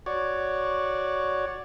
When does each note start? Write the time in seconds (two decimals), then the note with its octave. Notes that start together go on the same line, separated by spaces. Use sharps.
0.06 F#4 C#5 D5